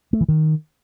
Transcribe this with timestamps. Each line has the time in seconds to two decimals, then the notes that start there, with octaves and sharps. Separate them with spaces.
0.13 A3
0.21 E3
0.29 D#3